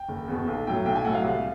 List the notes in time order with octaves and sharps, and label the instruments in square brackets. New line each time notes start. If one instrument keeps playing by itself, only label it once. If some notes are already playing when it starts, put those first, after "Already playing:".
Already playing: [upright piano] G5
F#1
E2 B2
B1
A2 F#3 G5
B1 G5
G#5
A2 F#3 F#5
F5
C2